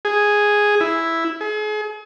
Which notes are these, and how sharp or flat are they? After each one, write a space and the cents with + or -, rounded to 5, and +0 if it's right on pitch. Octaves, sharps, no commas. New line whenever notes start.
G#4 +0
E4 +0
G#4 +40